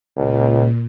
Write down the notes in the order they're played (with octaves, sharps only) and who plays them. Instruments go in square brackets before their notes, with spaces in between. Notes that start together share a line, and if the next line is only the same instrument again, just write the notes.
[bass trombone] C#2 [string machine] A#2